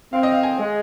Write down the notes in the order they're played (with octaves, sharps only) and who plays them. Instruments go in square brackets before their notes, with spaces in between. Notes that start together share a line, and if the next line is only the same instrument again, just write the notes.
[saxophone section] C4 [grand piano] F5
[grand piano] D#5
F5
G#5
[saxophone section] G#3